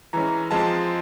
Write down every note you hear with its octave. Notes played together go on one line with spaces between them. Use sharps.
E3 G#3 C#4 A#5
F3 G#3 C4 A5